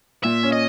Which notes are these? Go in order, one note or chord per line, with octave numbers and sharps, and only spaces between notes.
A#2 E5
C#4
D#5